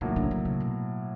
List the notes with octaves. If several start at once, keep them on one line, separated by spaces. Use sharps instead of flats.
A2 D#3 F#3 A#3
D3
D3
C#3
B2